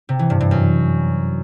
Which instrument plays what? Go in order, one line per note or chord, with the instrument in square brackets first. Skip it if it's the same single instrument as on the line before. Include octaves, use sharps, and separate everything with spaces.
[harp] C3
E3
G2
G2
F#2